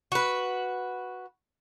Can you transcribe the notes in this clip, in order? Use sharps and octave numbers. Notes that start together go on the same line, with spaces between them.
F#4 B4